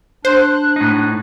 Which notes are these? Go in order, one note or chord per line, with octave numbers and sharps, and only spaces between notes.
D4 C5 F#6
A2 D#4